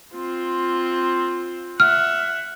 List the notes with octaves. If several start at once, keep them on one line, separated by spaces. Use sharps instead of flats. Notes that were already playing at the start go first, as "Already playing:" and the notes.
C4 F4
E5 F#5 F6